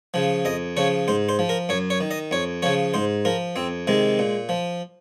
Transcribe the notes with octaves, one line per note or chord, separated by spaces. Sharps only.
C#3 F3
F2 D#5
C#3 F3 C#5
G#2 C5
C5
F3
A#4
F#2 C#5
C#5
D#3
D#5
F2 C#5
C#3 F3 C#5
G#2 C5
F3 A#4
F2 C4
C3 D#3 G#3
A#2
F3